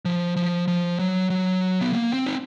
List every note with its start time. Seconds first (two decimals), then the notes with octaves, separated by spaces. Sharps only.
0.05 F3
0.36 F3
0.68 F3
0.99 F#3
1.30 F#3
1.81 B3
1.93 A#3
2.13 C4
2.26 D#4